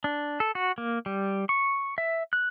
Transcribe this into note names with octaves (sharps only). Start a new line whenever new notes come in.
D4
A4
F#4
A#3
G3
C#6
E5
F#6